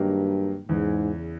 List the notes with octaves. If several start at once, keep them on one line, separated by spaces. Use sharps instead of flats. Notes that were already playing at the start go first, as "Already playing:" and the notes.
Already playing: G2 D#3 F#3 A#3 D#4 G4
E2 G#2 C#3 E3